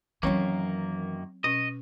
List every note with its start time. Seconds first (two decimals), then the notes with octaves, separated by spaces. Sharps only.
0.23 F#2 D#3 E3 F#3 A#3 C4 C#4 C#5
1.44 B2 C#4 D#5